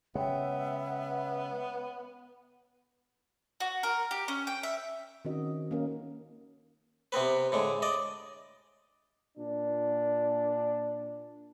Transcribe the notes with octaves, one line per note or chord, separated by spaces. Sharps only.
C#3 G#3 B3 C#5 E5 G5
F#4
A#4
G4
C#4
G5
E5
D#3 C4 C#4 F#4 D#5
A#3 C#4 A#4
C3 B3 C4 B4
A2 D3 G#3
D5 D#5
A#2 D4